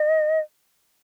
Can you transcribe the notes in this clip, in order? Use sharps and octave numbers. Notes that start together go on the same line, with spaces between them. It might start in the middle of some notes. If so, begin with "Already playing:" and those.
Already playing: D#5